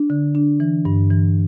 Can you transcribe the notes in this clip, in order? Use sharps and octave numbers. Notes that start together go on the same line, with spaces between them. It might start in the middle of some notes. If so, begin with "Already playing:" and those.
Already playing: D4
D3
D4
E3
G2
E3